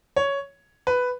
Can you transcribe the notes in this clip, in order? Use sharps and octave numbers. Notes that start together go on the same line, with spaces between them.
C#5
B4